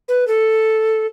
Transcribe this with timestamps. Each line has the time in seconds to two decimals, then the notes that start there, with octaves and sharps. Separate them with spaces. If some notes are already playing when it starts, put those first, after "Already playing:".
0.08 B4
0.27 A4